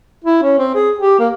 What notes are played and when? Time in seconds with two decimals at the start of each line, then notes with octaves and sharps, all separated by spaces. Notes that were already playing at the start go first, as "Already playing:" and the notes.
0.24 E4
0.42 C#4
0.58 C4
0.74 G#4
0.99 G4
1.19 A#3